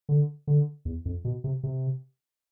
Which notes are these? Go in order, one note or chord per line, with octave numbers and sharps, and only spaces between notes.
D3
D3
E2
F2
B2
C3
C3